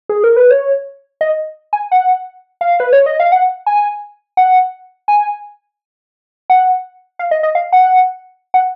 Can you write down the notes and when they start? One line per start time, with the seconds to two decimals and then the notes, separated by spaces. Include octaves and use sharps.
0.09 G#4
0.24 A#4
0.36 B4
0.51 C#5
1.21 D#5
1.73 G#5
1.92 F#5
2.61 F5
2.80 B4
2.93 C#5
3.06 D#5
3.20 F5
3.32 F#5
3.67 G#5
4.37 F#5
5.08 G#5
6.50 F#5
7.19 F5
7.31 D#5
7.43 D#5
7.55 F5
7.73 F#5
8.54 F#5